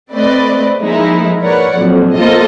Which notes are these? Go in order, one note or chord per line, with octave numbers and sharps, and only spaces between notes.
A3 C4 B4 D5 D#5
F3 G#3 A#3 D#4 E4
A#4 B4 C#5 D5 F#5
A#1 F2 F#3
A#3 B3 F4 A4 C5 D#5